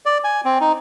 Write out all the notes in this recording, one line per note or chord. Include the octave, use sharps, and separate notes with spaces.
D5
G#5
C4
D#4